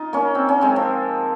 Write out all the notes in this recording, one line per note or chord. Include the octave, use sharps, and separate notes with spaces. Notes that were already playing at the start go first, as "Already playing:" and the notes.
Already playing: D#4 F4
A#3 C#4
C4
C#4
G#3 C4
F3